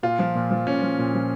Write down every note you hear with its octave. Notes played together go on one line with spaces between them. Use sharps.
A#2 F4
F3
A#2
F3
A#2 C#4
F3
A#2
F3